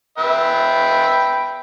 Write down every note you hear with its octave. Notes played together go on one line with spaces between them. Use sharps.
B4 E5 G5